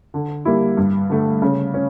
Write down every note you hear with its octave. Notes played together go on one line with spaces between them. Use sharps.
D3
G3 A#3 E4
G2
D3 A3
C#3
C#4